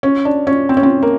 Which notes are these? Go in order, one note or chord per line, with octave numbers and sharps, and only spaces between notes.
C#4
D4
C#4
C4
C#4
C4
A#3